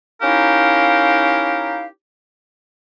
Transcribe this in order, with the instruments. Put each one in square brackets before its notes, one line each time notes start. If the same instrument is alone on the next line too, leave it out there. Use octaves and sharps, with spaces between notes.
[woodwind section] C#4 D#4 E4 G4 A#4 F5